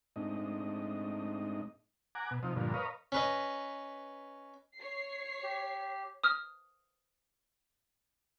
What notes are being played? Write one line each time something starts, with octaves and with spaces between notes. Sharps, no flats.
G#2 A3 C4 D4 D#4 D#5
F#5 G#5 A#5 D6
B2
C3 F3 D#4
G2 A#2 D3 F3
A#4 B4 C#5 D#5 F5
C#4 B4 D#5
C#5 C7
G4
D#6 F6